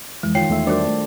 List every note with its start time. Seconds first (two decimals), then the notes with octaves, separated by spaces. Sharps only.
0.23 F2 E3 G#3
0.35 D#3 F4 C#5 G5 C7
0.50 E2 A3 E5
0.67 G3 D4 F#4 A#4 C5 D5
0.87 A3